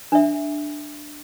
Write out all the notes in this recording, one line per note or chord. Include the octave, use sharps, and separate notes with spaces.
D4 E5